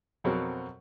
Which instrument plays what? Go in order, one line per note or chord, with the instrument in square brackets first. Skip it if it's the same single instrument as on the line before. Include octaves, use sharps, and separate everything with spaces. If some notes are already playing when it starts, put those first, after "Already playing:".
[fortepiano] F2 B2 F#3 C4 A#4